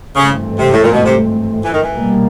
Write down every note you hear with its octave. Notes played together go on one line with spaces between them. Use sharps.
G#1 G2 C#3 E3 A3 C4
C3
A2
A#2
B2
C3
E3
D#3
E3
C2 B2 G3 A#3